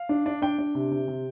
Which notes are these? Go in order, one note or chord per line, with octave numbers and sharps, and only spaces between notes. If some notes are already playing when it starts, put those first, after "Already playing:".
Already playing: F5
D4
D4
D4 G5
D4
C3
C3
C3